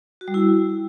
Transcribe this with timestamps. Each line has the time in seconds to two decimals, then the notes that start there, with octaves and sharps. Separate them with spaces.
0.21 F#4
0.28 G3
0.34 E4